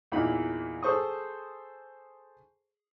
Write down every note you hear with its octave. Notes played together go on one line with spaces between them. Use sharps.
E2 A#2 E3 D#4 B5
G#4 A4 C5 C#6 D#6